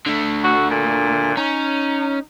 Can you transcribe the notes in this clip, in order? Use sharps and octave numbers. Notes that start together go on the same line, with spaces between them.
D3 A3
F#4
A#2
C#4 D#4